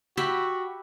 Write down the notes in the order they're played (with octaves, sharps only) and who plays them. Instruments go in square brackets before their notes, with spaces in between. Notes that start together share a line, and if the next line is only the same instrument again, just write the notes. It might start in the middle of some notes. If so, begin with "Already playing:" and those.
[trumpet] F#4 [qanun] G4 E5 B5